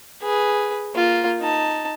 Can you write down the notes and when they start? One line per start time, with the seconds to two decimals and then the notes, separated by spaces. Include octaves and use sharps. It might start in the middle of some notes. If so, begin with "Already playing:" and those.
0.22 G#4 B4
0.94 A#3 F4
1.40 D#4 A5